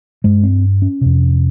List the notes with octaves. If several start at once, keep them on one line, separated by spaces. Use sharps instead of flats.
G2 G#3
C4
C#4
F2 C3